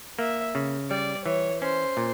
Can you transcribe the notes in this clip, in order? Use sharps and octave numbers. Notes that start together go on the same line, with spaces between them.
A#3 E5
C#3
G3 D5
E3 C#5
C#4 C5
A#2